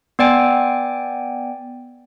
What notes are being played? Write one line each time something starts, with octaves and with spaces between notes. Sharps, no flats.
B3 D5 G5 G#5